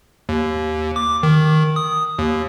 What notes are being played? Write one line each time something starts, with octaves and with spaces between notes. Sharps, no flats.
D#2
D6
D#3
D#6
D#2